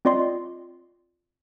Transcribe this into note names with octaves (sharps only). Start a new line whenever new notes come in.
C4 F4 D5 D#5 C6